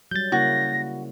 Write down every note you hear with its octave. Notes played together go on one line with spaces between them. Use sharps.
F#3 G3 G6 A6
C#3 A#3 E4 F#4 A#6